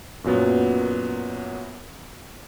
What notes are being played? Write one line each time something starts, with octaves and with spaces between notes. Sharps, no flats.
F#2 A#2 F#3 B3